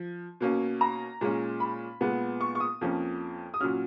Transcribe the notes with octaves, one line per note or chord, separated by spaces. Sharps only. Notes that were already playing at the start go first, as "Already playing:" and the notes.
Already playing: F3
B2 A#3 C#4
A#5
A#2 G#3 C#4
B5
A#2 G#3 B3
C#6
C#6
D#6
F2 F3 A#3 C#4
D#6
A#2 F#3 C#4 F6